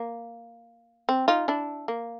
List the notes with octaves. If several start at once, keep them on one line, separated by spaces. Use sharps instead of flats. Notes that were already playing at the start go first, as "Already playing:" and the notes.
Already playing: A#3
C4
D#4 F4
D4 E4
A#3